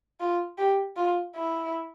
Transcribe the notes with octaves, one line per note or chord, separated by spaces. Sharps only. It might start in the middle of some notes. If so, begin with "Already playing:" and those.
F4
G4
F4
E4